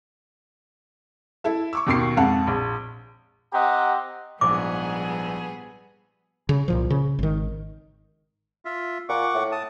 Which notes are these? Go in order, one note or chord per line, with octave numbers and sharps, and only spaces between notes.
E4 A4 E5
C#6 D6 E6
D#2 B2 D#3 C#6 C7
F2 G#2 F5 F#5 A5
A#1
C4 G4 D#5 F#5 A#5
A#1 G#2 F3 G3 B3 G#4 D6
C#3
C2 A#2 F3
C#3
G#1 D#3
F4 E5
A#2 F#5 C#6 D6
A2
A5 D#6